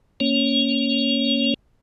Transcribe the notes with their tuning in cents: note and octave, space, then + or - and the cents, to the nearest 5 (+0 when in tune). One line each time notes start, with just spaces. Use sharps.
A#3 +0 C#4 +0 C#5 +0